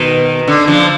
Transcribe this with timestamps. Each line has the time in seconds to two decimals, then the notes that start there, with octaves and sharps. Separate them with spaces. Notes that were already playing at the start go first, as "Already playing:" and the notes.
Already playing: B2 D#3
0.48 D3
0.67 D3 F3